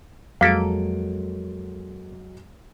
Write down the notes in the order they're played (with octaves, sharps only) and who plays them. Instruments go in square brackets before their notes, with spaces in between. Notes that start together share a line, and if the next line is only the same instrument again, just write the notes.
[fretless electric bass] F2 [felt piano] F#3 G#3 D7 [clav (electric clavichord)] A#3 A4 [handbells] F5 B6